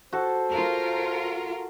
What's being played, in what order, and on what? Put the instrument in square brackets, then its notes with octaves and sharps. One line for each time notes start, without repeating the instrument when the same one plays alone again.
[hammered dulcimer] F#4 A4 [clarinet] C5
[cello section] F4 A#4